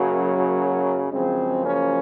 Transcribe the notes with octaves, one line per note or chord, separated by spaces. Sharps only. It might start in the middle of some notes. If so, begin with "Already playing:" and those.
Already playing: F#2 C#3 F#3 A#3
F#2 C#3 F3 G#3 C4
A#3 C#4